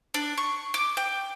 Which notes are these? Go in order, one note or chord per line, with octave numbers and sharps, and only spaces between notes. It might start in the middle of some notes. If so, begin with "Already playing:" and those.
D4
C#6
D6
G5